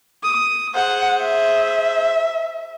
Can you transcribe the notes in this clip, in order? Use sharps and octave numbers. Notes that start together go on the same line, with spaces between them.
D#6
G#4 C5 F#5
E5